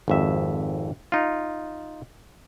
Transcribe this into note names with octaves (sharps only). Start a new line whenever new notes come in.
G#1 F2 E5
D#4 F4